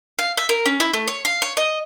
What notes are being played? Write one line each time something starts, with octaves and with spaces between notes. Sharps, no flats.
F5
E5
A#4
C#4
E4
A3
C#5
F5
C#5
D#5